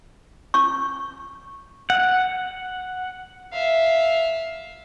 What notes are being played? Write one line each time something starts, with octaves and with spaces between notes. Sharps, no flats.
C#6
F#5
E5 F5